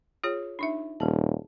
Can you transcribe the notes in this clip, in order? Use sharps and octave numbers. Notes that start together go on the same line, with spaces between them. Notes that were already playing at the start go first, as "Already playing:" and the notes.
F4 G#4 C#5
D4 D#4 E5
D#1 G#4 A5